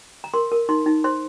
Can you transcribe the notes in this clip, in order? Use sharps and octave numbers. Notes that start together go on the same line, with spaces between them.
A#5
A#4 C6
A#4
D#4 C6
D#4
C5 C6